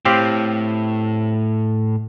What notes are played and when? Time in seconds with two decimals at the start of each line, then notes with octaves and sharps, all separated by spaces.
0.05 A2 C4 G4 F5